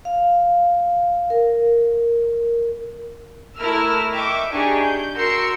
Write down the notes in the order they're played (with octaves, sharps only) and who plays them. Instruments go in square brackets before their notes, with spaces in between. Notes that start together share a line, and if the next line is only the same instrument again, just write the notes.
[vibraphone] F5
A#4
[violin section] A3 E4 A#4 E6 F6
D#5 E5 G5 C#6 D6
D4 D#4 G4 G#4 G#5 C#6
G6
F#4 A#4 C6 E6 C#7